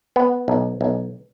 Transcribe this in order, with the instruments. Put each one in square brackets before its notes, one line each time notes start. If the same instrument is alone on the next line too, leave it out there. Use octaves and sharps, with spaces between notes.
[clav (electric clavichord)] B3
B1
B1